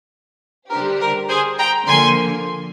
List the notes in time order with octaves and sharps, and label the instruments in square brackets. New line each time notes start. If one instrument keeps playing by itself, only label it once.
[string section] D3 G3 D4 G4 C5 [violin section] A#4
[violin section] A#4
G#4 C5
G5 A#5
[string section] D3 F3 A#3 [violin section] G#5 C6